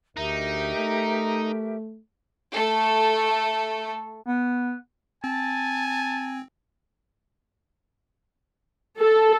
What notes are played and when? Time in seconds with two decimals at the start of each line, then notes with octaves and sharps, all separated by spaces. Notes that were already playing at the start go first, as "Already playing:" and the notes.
0.17 D2 D#4 G4 A#4 E5
0.76 A3
2.55 A3 A4
4.26 B3
5.24 C4 G#5 A5
8.98 A4